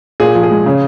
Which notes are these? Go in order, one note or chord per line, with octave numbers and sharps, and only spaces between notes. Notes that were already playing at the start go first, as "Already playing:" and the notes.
A#2 G#4
F3
G#4
G#3
C#3